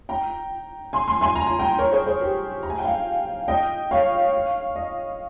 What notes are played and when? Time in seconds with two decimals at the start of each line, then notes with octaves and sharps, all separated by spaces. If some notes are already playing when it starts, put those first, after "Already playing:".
0.09 G5 A#5
0.93 G#5 C6
1.08 G#5 C6
1.21 G#5 C6
1.36 A#5
1.47 G#5
1.59 G5 A#5
1.78 A#4 C#5
1.92 G#4 C5
2.06 G#4 C5
2.21 G4 A#4
2.63 A#5
2.70 G#5
2.78 G5
2.85 F5 G#5
3.48 D#5 G5
3.91 C#5 F5
4.76 D#5